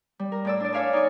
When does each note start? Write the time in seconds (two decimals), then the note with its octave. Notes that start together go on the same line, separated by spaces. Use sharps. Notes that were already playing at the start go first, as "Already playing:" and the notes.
0.19 G3
0.32 A#4
0.45 A2 D5 E6
0.60 D4 D5
0.72 C#5 E5 F5 G#5 D6
0.93 D#4 D5 C#6